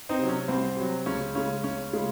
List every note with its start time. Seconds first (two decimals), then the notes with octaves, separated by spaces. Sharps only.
0.09 C4 D#4
0.19 C3 F#3
0.28 C#4
0.48 C2 C4
0.77 C3 F#3
1.06 C#2 C#4
1.35 C#3 G#3 C#4
1.64 C#2 C#4
1.93 C#3 G#3